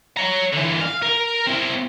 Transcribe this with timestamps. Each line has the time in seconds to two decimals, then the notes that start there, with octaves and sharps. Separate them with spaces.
0.17 C#5 A#5
0.53 D3 E3
0.81 F5
1.03 A#4
1.47 C4 E4